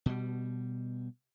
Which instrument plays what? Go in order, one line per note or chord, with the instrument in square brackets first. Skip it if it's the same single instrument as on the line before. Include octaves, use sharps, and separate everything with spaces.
[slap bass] B2 G3